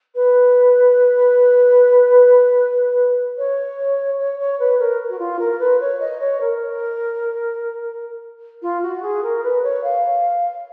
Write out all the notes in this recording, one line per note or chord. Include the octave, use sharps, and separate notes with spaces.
B4
C#5
C#5
C#5
B4
A#4
F#4
F4
A#4
B4
C#5
D#5
C#5
A#4
F4
F#4
G#4
A#4
B4
C#5
F5